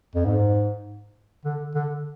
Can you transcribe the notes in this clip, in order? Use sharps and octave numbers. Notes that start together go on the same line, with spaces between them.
F2
G#2
D3
D3